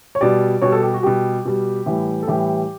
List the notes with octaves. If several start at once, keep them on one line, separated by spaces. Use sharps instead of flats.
C#5
B2 G3 D5
B2 G3 C#5
A4
G4
F#4
B2 G3 G4
B2 G3
A2 E3 G3
A4
A2 E3 G3 G4